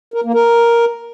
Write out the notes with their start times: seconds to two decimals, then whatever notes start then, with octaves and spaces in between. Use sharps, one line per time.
0.14 A#4
0.24 A#3
0.34 A#4